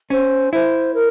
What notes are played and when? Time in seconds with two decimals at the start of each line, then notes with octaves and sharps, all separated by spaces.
0.10 C#4 C5
0.53 E4 C5
0.94 A#4